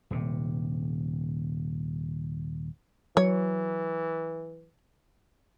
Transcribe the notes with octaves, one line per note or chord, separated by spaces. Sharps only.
D#1 C3
E3 F#3 C#5